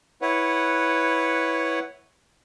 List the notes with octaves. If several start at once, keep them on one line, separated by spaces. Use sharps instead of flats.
E4 B4 C#5 F#5